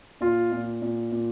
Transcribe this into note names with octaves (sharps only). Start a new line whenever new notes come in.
A#2 F4
A#2
A#2
A#2